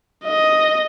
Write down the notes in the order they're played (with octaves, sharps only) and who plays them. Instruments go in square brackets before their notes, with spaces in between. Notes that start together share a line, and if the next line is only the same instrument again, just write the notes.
[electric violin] D#5